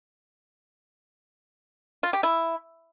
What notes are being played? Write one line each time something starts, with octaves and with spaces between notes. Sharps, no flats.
F4
G4
E4